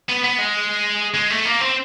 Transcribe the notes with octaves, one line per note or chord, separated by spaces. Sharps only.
B3
B3
G#3
G#3
A3
A#3
C4